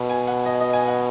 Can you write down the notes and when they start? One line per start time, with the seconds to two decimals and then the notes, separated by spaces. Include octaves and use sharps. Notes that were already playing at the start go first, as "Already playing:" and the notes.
Already playing: B2 B5
0.10 G#5
0.27 F#5
0.46 D#5
0.61 D#5
0.73 G#5
0.87 F#5